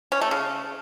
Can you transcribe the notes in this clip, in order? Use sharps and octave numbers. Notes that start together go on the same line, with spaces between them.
C#4
A3
C#3